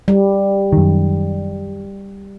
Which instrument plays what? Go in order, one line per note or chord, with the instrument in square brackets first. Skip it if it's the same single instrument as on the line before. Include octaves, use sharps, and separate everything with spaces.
[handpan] G3
[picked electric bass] F#2 D#3